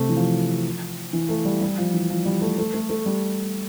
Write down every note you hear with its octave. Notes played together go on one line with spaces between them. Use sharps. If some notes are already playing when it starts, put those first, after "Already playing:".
Already playing: C3 A3
E3
F3
E3
A3
G3
G3
F3
E3
F3
G3
A3
A3
A3
A3
G3